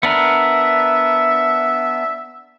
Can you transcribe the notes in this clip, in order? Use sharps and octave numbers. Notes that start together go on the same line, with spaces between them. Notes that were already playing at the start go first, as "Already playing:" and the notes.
B3 D4 A#4 E5